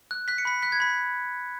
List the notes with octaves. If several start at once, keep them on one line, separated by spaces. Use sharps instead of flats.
F#6
F#6 B6
C#7
B5 B6
F#6 B6
G#6
B5 B6